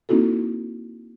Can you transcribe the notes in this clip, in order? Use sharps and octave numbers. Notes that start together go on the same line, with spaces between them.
A#3 C4 D#4 E4 F#4 A4